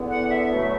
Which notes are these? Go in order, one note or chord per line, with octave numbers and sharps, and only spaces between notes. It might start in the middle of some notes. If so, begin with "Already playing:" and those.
Already playing: E2 D3 B3
F#5
E5
B2 F#3 A3